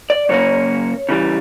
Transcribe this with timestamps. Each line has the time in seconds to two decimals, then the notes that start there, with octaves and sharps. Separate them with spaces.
0.10 D5
0.29 F#2 C#3 F#3 A#3 C#4 C#5
1.09 C#3 E3 G3